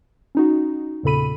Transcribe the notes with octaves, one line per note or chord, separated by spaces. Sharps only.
C#4 D#4 F#4
E2 A#2 C#3 A4 B5 D#7